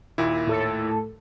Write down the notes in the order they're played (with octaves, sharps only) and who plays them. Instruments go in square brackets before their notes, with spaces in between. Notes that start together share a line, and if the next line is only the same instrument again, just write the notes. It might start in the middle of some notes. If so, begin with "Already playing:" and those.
[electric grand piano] D#2 A#2 E4
[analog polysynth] A2 A4